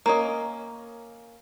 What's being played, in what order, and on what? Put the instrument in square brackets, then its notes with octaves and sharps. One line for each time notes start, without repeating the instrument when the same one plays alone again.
[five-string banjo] A#3 C#4 D#5